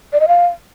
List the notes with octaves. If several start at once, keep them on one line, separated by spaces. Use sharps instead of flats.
D5
D#5
F5